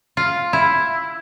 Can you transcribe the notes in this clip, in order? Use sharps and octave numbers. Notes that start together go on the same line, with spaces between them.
F4
E4